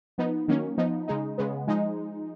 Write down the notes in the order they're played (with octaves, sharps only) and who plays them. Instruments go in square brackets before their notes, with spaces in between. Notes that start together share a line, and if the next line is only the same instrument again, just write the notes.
[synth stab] F3 B3 D#4
D#3 F#3 A#3 C#4
F3 B3 D#4
C#3 G#3 D#4
C#3 G#3 B3
F3 G#3 D#4